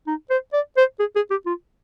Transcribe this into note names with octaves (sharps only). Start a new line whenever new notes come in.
D#4
C5
D5
C5
G#4
G#4
G4
F4